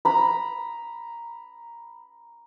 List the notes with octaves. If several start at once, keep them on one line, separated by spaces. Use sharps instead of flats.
A#5 B5